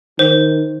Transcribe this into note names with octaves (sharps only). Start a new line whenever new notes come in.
D#3 C5